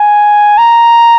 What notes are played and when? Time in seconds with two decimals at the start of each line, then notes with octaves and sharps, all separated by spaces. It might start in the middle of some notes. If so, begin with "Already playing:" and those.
Already playing: G#5
0.58 A#5